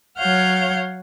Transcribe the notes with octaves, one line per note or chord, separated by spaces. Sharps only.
F#3 C#5 F5 F#5 F6 G6